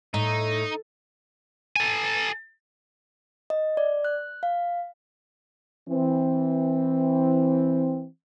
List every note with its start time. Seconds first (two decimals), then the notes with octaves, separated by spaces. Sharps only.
0.14 A2 D#4
1.76 A4 G#5
3.50 D#5
3.77 D5
4.05 F#6
4.43 F5
5.89 E3 C4